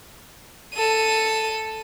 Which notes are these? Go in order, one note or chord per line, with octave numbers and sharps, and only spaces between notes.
A4 D#7